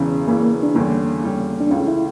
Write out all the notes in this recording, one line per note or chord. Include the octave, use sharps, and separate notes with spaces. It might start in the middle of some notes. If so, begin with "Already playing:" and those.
Already playing: E1 E2 C#3 E3 C#4
E1 E2 C#3 E3 A#3
A#3
D4
E2 D3 G3 A#3 C#4
E2 D3 G3 C#4
D4
C#2 C#3 E3 A3 C#4
E4